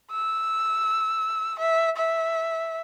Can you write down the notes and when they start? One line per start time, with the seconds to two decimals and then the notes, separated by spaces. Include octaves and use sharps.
0.11 E6
1.59 E5
1.97 E5